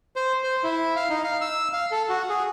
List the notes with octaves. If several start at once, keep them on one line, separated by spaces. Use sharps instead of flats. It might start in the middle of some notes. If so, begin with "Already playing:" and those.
C5
C5
E4
F5
D#4
F5
E6
F5
A4
F#4
G#4